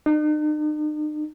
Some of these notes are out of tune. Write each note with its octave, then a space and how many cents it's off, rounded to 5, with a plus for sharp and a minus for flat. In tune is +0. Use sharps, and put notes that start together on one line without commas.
D#4 -45